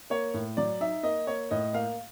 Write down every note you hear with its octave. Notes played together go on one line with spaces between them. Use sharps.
A#3 C#5
A2
F#3 D5
D#4 E5
A#3 D#5
A#3 C#5
A2 D#5
A#3 F5